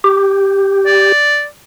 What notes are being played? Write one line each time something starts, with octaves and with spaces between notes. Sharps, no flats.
G4
D5